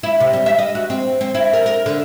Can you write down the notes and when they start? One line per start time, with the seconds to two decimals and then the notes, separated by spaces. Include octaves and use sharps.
0.03 E4
0.20 C3
0.33 G3
0.46 E5
0.59 D#5
0.75 F#4
0.90 C4
1.21 C4
1.35 E4
1.53 A#4
1.66 A#4
1.86 D3